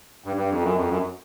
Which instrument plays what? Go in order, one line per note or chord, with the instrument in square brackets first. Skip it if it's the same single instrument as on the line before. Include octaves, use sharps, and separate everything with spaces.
[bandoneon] G2
G2
F2
F#2
F2
F#2